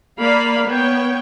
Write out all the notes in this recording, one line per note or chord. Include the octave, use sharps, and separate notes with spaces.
A#3 D5 F5 B5
B3 C#5 G5